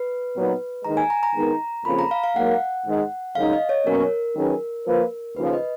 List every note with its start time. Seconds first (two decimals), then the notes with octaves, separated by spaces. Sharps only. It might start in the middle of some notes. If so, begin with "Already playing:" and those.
Already playing: B4
0.36 A#2 F#3 B3 D#4
0.85 D#2 D#3 G#3 A#5
0.97 G#5
1.10 A#5
1.23 A#5
1.35 D#3 G#3 B3 D#4 A#4
1.85 F2 C#3 F3 A#3 B5
1.99 A#5
2.11 F5
2.24 F5
2.36 G#2 F#3 A#3 F#5
2.86 G#2 D#3 G#3
3.35 F#2 C#3 G#3 D#4 F5
3.53 D#5
3.69 C#5
3.86 B2 F#3 A#3 C#4 A#4
4.36 D#3 F#3 C#4 G#4 B4
4.86 F3 A#3 F4 B4
5.36 D#2 C#3 F3 B4
5.53 D#5